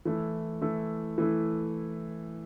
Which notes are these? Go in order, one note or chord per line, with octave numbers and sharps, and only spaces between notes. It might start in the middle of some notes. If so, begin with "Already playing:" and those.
E3 A3 E4
E3 A3 E4
E3 A3 E4